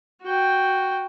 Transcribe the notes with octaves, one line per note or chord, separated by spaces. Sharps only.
F#4 G5